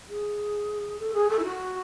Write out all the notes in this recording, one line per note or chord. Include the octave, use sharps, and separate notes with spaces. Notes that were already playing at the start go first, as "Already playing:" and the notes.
G#4
A4
G#4
A4
E4
F#4